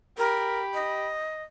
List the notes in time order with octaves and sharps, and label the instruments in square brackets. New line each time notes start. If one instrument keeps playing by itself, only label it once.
[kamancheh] G4 B5 [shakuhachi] A#4
[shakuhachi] D#5